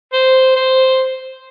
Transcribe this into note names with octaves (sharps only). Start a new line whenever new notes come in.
C5
C5